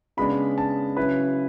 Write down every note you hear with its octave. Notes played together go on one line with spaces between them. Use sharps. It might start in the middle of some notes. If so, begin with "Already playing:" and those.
C#3 G#3 B3 D4 B5
A5
C#3 F#3 C#4 E4 B4